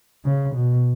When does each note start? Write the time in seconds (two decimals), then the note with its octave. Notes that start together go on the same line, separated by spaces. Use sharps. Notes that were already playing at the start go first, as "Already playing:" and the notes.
0.25 C#3
0.55 B2